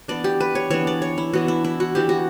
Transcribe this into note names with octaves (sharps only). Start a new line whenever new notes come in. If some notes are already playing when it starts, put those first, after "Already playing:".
E3 B3 D4 D5
G4
B4
C#5
E3 B3 D4 C#5
D5
C#5
E4
E3 B3 D4 F#4
E4
E4
F#4
E3 B3 D4 G4
F#4